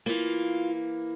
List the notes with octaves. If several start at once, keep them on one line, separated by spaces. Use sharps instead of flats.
E3 A#3 F4